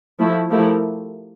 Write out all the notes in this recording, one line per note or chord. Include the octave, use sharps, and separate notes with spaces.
F3 A3 E4
F3 A3 E4 G4 A#4